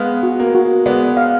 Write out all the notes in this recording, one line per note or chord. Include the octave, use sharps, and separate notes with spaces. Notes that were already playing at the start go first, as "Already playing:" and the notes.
Already playing: G#3 B3 F5
F#4
A#3
F#4
G#3 B3 D5
F5